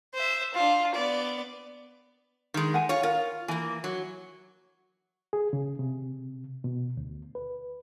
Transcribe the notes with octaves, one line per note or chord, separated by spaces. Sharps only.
C5 E5
D4 F4
B3 D5
D#3 G#3
F#5 G#5
F4 C#5
F4 A#4
E3 A#3 G#5
F#3
G#4
C#3
C3
B2
D2
B4